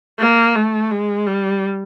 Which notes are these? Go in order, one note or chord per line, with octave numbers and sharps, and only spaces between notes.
A#3
A3
G#3
G3